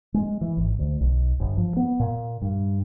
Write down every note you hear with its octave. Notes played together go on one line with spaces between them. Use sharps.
G#3
E3
G#1
D2
B1
G1
F3
B3
A#2
G2